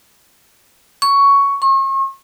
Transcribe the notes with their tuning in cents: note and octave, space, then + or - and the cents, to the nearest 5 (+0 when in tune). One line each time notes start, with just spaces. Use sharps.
C#6 +10
C#6 -40